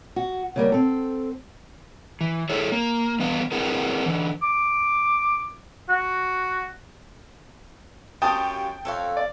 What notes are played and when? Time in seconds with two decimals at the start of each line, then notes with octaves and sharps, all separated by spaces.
0.16 F#4
0.56 C#3 G3 A#3
0.72 C4 A4
2.21 E3
2.49 E4 G#4 A4 C#5
2.72 A#3
3.19 G2 E3 B3 B4 F5
3.52 C4 E4 G#4 A#4 B4 F#5
4.06 D3 E3
4.42 D6
5.89 F#4
8.22 F#2 F4 G4 G5 A5 D#6
8.85 F2 A4 C#5 F5
9.17 D5